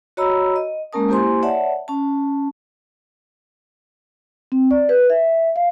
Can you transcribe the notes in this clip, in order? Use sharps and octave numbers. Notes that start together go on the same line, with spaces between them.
F#4 C#5 D#5 A#5 B5 E6
D#5
G#3 A#3 C#4 A#4 A5 D#6
A#3 E4 G4 C5 G#5 C6
C#5 D5 E5 F#5 A5
C#4 A5
C4
D5
B4
E5
F5